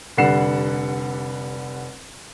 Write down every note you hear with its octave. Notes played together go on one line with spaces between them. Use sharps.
F1 D3 G3 F#5 C7 E7